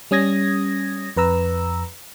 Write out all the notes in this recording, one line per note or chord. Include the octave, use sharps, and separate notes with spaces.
G3 C#4 D#6 G#6 A#6
F2 B4 A#5 E6